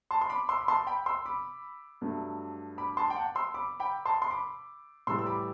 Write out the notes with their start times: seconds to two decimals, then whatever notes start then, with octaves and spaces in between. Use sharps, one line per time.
0.11 A5 C6
0.21 C6
0.29 B5 D6
0.49 C6 E6
0.61 B5
0.68 A5 C6
0.87 G5 B5
1.06 C6 E6
1.26 B5 D6
2.01 G2 F#3 A3
2.78 B5 D6
2.97 A5 C6
3.10 G5
3.16 F#5 A5
3.35 C6 E6
3.54 B5 D6
3.80 G5 B5
4.06 A5 C6
4.22 C6
4.30 B5 D6
5.07 A2 E3 G3 C6 E6
5.19 E6
5.26 B5 D6